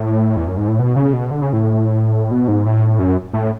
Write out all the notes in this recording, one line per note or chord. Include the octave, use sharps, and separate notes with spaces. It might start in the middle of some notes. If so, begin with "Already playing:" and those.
Already playing: A2
E2
F#2
G#2
A2
B2
C#3
B2
D3
C#3
A2
B2
G#2
A2
F#2
A2